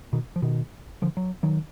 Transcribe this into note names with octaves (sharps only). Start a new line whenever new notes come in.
B2 D#3
F3
B2 D#3
D3 F3
F#3
D#3 F#3